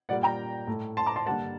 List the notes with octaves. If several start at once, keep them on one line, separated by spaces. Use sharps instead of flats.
A#2 G3 A#3 D5 F#5
G5 A#5
A2 A3
A5 C6
A#5 D6
A5 C6
G2 D3 G3 A#3 F#5 A5